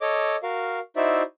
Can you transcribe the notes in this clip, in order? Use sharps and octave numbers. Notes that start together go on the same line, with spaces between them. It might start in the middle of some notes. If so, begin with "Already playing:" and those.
A4 C#5 D#5 D6
F#4 A#4 F5
D#4 E4 F#4 C5 D5 E5